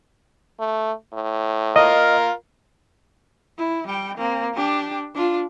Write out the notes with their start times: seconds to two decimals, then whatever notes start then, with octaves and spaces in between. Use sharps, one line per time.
0.60 A3
1.14 A2
1.76 F4 A#4 D#5
3.58 E4
3.87 G3 G5
4.17 A#3 C4
4.54 D4 G4
5.15 D4 F4